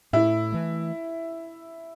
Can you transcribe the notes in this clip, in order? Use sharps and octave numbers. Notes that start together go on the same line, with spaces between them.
A2 E4
E3 A3